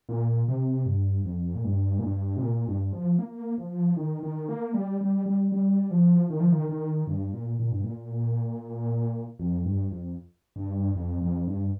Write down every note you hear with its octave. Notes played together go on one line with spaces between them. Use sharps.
A#2
C3
G2
F2
A#2
G2
A#2
G2
C3
A#2
G2
F3
A#3
F3
D#3
D#3
A#3
G3
G3
G3
G3
F3
D#3
F3
D#3
D#3
G2
A#2
A#2
G2
A#2
F2
G2
F2
G2
F2
F2
G2